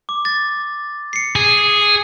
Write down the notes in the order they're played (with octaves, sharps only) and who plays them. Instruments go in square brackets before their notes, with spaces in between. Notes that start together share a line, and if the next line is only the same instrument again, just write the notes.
[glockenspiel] D6
A6
C7 C#7
[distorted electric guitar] G#4